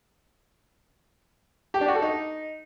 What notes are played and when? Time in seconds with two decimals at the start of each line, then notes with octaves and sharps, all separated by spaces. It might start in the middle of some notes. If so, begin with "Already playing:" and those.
1.74 G4
1.81 D4
1.88 F#4
1.95 A4
2.02 D#4